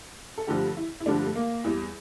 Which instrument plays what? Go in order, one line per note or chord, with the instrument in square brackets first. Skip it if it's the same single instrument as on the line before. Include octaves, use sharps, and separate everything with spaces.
[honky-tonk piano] A4
G2 D3 F3 A3 G4
E4
E4
G2 D3 F3 A3 D4
A3
A#3
E2 E3 G3